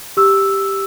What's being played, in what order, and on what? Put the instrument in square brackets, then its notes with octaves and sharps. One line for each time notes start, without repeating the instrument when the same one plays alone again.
[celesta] G4 E6